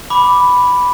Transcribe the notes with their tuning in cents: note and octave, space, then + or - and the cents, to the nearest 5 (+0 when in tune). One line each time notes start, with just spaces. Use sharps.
B5 +0 D6 -5